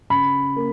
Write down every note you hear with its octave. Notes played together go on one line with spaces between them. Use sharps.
C#3 B5
A#3